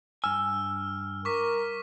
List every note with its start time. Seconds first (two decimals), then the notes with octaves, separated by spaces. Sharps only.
0.24 G2 G#5 E6 F6
1.25 A#4 C#6 D6 B6